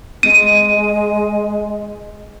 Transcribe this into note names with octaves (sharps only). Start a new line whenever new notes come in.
G#3 D#7